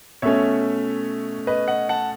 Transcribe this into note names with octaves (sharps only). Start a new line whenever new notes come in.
B2 A3 C#4 C#5 E5
B4 D#5
D#5 F#5
F#5 A5